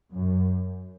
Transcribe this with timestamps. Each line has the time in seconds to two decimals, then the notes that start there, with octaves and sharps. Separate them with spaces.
0.11 F#2